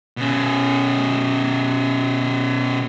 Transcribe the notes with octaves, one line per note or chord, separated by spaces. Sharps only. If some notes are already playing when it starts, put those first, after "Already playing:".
B2 C#4